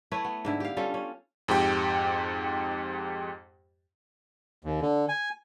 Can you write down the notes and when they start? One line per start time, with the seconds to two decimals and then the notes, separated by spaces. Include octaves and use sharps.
0.12 A3 E4 B4 C#5
0.25 B3
0.45 G#2 D3 E4
0.60 G4 F5
0.77 G3 C#4 F4 A4
0.94 C#4
1.48 F2 G#2 G4 G5
4.65 D#2
4.82 D3
5.09 G#5